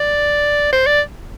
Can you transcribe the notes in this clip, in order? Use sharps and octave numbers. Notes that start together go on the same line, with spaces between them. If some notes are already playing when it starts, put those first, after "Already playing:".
Already playing: D5
C5
D5